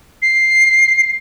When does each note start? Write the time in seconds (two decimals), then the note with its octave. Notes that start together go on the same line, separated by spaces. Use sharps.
0.22 C7